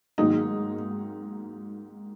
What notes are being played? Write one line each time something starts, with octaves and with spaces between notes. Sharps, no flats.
G#2 D#3 F#3 A#3 D#4